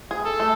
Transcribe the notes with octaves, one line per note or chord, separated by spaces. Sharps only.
G#4
A4
A3